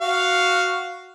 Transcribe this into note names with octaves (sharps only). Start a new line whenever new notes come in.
F#4 F5